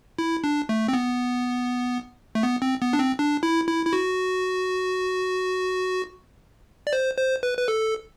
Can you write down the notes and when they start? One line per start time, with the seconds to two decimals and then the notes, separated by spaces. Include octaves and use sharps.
0.19 E4
0.44 D4
0.69 A3
0.88 C4
0.93 B3
2.35 A3
2.43 B3
2.62 C4
2.82 B3
2.93 D4
2.99 C4
3.19 D4
3.43 E4
3.68 E4
3.85 E4
3.93 F#4
6.87 D5
6.93 C5
7.18 C5
7.43 B4
7.58 B4
7.68 A4